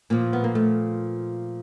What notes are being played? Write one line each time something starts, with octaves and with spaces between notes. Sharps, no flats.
A#2 F3 A#3
B3
A#3
A3